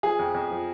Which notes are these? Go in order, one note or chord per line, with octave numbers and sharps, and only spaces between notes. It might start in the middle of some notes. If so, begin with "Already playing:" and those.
F3 G#4
F2
F2
F3